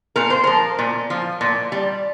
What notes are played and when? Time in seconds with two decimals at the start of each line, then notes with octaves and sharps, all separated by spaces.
0.16 A#2 A#4
0.30 C5
0.44 F3 A#4
0.79 A#2
1.10 F3
1.41 A#2
1.72 G3